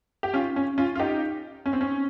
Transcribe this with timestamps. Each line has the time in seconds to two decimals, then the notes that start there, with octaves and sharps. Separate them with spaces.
0.23 G4
0.34 C#4 F4
0.56 C#4
0.78 C#4 F4
0.95 F4
0.99 D#4 G4
1.66 C#4
1.73 C4
1.81 C#4